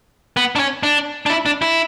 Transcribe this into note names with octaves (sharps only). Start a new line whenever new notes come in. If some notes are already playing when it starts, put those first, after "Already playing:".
B3
D4
C#4
D4
D4
E4
D4
E4